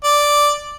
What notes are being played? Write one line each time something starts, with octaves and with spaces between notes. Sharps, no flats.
D5